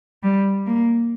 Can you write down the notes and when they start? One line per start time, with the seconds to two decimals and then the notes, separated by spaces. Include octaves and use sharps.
0.23 G3
0.67 A#3